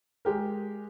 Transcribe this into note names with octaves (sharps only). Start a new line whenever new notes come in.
G#3 G4 A#4